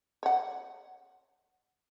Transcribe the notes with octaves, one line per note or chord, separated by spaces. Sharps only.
C#5 F#5